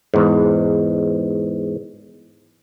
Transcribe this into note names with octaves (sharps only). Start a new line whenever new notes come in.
E2 G#2